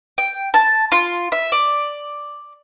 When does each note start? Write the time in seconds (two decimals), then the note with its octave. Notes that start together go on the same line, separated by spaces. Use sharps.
0.18 G5
0.54 A5
0.92 F4
1.32 E5
1.52 D5